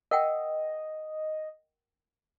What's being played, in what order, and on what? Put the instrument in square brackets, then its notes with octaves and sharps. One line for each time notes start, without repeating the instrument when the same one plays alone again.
[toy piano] A#4 F#5 G5 [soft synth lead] D#5